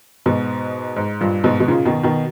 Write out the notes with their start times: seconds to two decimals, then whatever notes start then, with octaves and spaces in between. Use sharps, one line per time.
0.26 G#2 B2
0.96 G#2
1.21 G2 A#2
1.44 G#2 B2
1.60 B2
1.68 A#2 C#3
1.85 B2 D#3
2.03 B2 D#3